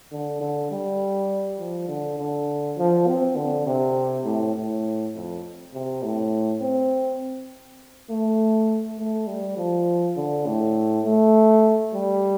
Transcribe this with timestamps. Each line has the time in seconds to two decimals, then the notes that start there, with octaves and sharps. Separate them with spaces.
0.12 D3
0.41 D3
0.71 G3
1.59 F3
1.88 D3
2.18 D3
2.78 F3
3.08 C4
3.36 D3
3.66 C3
4.25 A2
4.55 A2
5.15 F2
5.74 C3
6.03 A2
6.61 C4
8.10 A3
8.99 A3
9.27 G3
9.57 F3
10.17 D3
10.46 A2
11.05 A3
11.94 G3